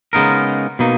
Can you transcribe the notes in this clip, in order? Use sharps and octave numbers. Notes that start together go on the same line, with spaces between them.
C#3 G#3 B3 D#4 A#4
B2 A#3 D#4